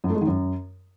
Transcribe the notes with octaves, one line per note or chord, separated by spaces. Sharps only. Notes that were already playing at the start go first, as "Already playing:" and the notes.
F#2
A3
G#3
D#3
F#2